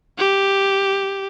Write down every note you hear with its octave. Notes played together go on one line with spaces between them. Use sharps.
G4